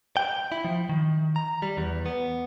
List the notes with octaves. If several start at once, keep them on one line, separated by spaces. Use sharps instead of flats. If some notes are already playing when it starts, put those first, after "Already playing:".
G5
E4
F3
D#3
A#5
G3
E2
B3